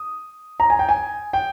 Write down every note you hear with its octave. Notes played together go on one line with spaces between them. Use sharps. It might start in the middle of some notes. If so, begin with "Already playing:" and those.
Already playing: D#6
A#5
G#5
G5
G#5
G5